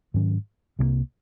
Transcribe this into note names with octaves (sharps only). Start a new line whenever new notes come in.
G#2 D#3 F#3 C#4
C2 C3 D#3 A#3